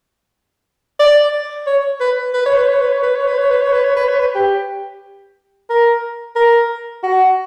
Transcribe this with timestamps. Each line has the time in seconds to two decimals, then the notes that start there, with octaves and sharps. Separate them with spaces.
1.00 D5
1.66 C#5
2.00 B4
2.34 B4
2.46 C#5
2.57 B4
2.68 C#5
2.81 B4
2.93 C#5
3.03 B4
3.16 C#5
3.27 B4
3.38 C#5
3.51 B4
3.62 C#5
3.73 B4
3.84 C#5
3.96 B4
4.09 C#5
4.20 B4
4.35 G4
5.70 A#4
6.36 A#4
7.03 F#4